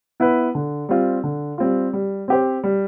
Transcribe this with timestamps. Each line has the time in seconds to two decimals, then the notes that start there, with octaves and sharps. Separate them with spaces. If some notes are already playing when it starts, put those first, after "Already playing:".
0.20 B3 E4 B4
0.55 D3
0.89 G3 C4 F4
1.23 D3
1.58 G3 C4 F4
1.93 G3
2.28 C4 G4 C5
2.64 G3